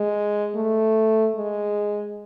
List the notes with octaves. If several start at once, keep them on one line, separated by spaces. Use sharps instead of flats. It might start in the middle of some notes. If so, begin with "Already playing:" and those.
Already playing: G#3
A3
G#3